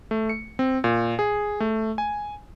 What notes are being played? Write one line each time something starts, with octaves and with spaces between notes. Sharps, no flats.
A3
C#7
C4
A#2
G#4
A3
G#5